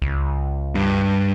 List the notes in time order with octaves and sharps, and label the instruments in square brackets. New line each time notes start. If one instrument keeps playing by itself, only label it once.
[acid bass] C#2
[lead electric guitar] G2